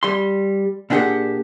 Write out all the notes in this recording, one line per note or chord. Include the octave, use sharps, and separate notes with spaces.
G3 C6
A#2 D4 F4 G4 G#4 F#5